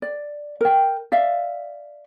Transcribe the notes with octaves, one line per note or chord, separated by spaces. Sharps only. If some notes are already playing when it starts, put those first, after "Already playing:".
D5
A#4 G5
D5 E5 F5